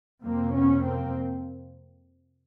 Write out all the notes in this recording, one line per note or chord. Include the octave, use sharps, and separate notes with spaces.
F2 C3 A#3 C4
B3 C#4
A#3 C4